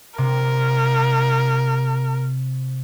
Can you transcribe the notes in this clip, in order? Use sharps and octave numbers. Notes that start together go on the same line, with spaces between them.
C3 A#4